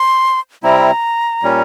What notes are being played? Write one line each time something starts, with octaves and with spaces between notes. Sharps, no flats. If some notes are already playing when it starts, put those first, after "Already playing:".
Already playing: C6
C3 G3 C4 E4 A#5
A#2 G3 C#4